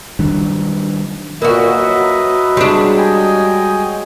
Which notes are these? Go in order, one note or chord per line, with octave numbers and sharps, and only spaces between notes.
D#3 F#3 G3 D4
A#2 A#3 F#4 B4 D#5 E5
F#3 F#5
G3 G#3 D4 C#5
D#5 G5 G#5